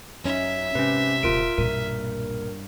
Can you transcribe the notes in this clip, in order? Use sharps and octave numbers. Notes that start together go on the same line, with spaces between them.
F#2 C#4 D#4 E5
G#2 C3 C#4 B4
D#1 D#2 F4 A#4 D7
B1 G2 A#2 A#4